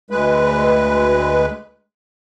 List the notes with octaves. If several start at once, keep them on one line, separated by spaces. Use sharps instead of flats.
D2 G#3 B4